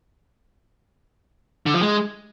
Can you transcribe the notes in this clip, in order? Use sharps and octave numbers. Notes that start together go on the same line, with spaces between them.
D3
F3
G#3